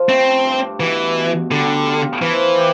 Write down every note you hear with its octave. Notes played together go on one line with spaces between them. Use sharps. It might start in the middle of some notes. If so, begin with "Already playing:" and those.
Already playing: F3 F4
A3 C4
G2
B2 E3
B2
D3 G3
F4
E3 F3
G4